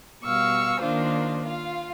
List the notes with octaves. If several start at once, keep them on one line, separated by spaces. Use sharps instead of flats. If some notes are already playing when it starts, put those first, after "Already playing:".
B2 G3 F5 C#6 E6
D#3 A#3 D4 F4 C5
F4 F5